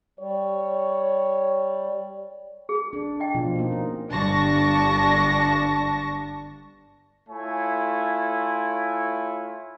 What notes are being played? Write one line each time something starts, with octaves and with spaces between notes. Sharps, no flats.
G3 C#5
G#4
D4
D#5 G5
B2 F3 F4
A#3 D#4
C#4
G1 G2 D4 A5 C#6 A#6
A3 E4 F4 C#5 G#5